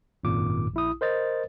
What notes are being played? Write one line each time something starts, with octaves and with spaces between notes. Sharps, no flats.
G#1 F#2 A#2 D6
A#1 E4 D#6
A#4 C5 D#5 A6